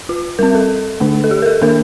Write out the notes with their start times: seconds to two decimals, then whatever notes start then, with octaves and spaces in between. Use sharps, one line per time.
0.09 F4
0.39 G3 C4 A#4
0.55 A4
1.00 D3 A3 D4
1.24 A4
1.31 G4
1.42 A#4
1.46 A4
1.62 D#3 A#3 D4 A#4